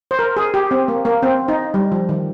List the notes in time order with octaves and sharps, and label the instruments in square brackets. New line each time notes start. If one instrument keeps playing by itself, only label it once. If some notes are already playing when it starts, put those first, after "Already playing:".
[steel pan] C5
A#4
G#4
G4
C4
A#3
A#3
C4
D#4
G3
F3
D#3